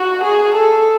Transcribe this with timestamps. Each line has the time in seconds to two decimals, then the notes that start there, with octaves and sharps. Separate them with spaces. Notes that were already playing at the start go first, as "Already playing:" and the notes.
Already playing: F#4
0.24 G#4
0.55 A4